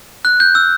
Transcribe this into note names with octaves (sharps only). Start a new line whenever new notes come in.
F#6
G6
E6